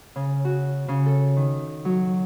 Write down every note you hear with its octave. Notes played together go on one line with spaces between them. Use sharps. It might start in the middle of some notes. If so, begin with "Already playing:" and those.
C#3
F#4
C#3
A4
D#3
F#3